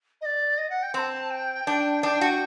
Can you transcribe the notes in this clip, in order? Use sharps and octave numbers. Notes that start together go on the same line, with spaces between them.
D#5
D5
D#5
F#5
G5
C4 A5 C6
G5
D4
D4 G5
F#4